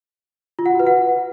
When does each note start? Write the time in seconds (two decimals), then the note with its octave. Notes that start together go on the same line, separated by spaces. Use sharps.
0.59 F4
0.66 F#5
0.73 F#4
0.80 B4
0.86 F#5